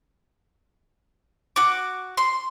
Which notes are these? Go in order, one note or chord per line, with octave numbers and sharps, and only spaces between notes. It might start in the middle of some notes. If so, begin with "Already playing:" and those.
F#4 D6
C6